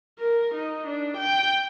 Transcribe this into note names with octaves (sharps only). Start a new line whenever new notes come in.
A#4
D#4
D4
G5